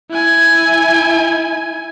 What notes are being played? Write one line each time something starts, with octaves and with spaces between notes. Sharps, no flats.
E4 G#5